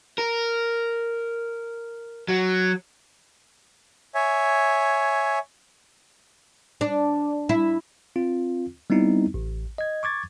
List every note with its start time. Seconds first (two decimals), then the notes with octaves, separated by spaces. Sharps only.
0.18 A#4
2.28 F#3
4.15 C#5 E5 G#5
6.81 D4
7.49 E4
8.16 C4 F4
8.90 G3 B3 C4 D#4 E4
9.34 A1
9.78 D#5 G#6
10.03 C#6 D6 G#6 A6